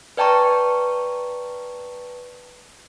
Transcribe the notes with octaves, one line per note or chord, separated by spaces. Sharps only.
B4 D5 G5 A5 A#5 C#6